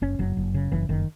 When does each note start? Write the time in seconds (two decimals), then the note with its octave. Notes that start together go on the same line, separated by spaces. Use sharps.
0.02 F#1 C#4
0.19 F#1 F#3
0.37 F#1
0.54 C#3
0.72 F#1 E3
0.89 F#1 D#3